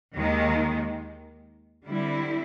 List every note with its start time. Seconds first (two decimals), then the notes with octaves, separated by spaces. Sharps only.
0.16 D#2 D#3 G#3
1.86 D3 G3 C4 E4